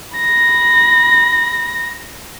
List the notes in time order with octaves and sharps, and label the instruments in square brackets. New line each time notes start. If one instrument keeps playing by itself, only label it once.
[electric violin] B5 A#6